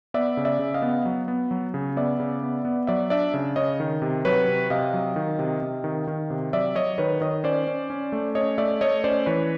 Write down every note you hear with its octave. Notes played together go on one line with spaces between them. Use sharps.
B3 D5 E5
C#3
D5 E5
C#3
D#5 F5
B3
F#3
B3
F#3
C#3
B3 D5 E5
C#3
B3
B3
F#3 D5 E5
D4 D5 E5
C#3
C#3 C#5 D#5
D#3
C3
F#3 B4 C#5
C3
C3 D#5 F5
F#3
D#3
C3
C3
D#3
D#3
C3
F#3 D5 E5
F#3 C#5 D#5
D#3 B4 C#5
D#3 C#5 D#5
C#4 C5 D5
C#4
C#4
A3
C#4 C#5 D#5
A3 D5 E5
A3 C#5 D#5
C#4 C5 D5
E3 B4 C#5